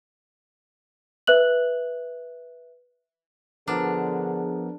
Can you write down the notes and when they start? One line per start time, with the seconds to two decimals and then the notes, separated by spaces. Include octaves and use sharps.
1.27 B4 E5 F#6 F#7
3.68 D3 F3 B3 D4 G#4 A#4